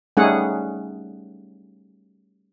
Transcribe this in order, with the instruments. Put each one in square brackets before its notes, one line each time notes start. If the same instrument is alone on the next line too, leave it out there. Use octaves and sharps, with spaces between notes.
[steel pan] G3 A3 C#4 D#4 G#4 F#5